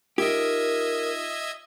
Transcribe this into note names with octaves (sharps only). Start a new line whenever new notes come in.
D#4 F4 G4 A#4 D#5 E5 D#6 G#6